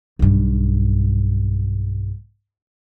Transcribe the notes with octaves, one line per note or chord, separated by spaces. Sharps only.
B1 G2